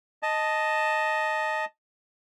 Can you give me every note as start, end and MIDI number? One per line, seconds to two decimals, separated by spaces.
0.23 1.65 75
0.23 1.65 81